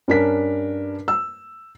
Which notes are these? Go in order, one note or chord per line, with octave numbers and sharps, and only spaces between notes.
G2 C#4 D4 A#4 B6
E6